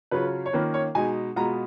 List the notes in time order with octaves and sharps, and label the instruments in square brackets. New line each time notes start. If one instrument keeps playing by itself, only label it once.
[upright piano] C#3 F#3 C#4 F4 B4
C#5
D#3 A#3 C#4 F4 B4
C#5
B2 G#3 D#4 G#5
B2 G#3 B3 F4 A#5